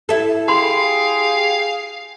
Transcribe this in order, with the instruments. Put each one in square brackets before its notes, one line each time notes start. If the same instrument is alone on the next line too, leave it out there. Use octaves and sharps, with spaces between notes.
[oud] E4 A4
[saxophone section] G4 G#4 [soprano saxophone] F5 [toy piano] B5 C6